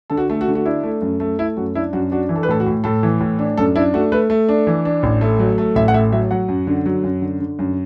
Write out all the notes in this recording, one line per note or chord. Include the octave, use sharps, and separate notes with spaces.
D3 A4
F#4
A3 A4
F#4
D3
F#4
D4 E4
A3
F#2
A3
A3 E4
F#2 F#4
D4 E4
F#2 F#4
D4 F#4
E3
A4
B4
A2 A4
F#4
A2
A2 A4
E3
A2
D4
F#2 A4
D4 E4
A3 F#4
A3 B4
A3
D4
E3
D4
A1
A3
F#3
A3
A1 E5
F#5
A2 E5
F#3 E5
F#3 F#5
F#2
D3
F#3
F#2
D3
D3
F#2